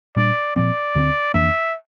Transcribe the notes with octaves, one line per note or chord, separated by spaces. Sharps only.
A#2 G3 D4 D5
A#2 F3 C4 D5
D2 D3 F3 C4
F2 E3 A#3 D4 E5